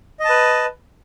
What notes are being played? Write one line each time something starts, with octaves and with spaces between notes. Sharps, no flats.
B4 D#5 A5